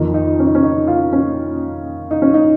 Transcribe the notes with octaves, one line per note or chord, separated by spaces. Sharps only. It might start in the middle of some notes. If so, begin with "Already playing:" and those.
Already playing: F2 D#3
D#4
C#4
D#4
C#4
D#4
F4
C#4
D#4
C#4
D#4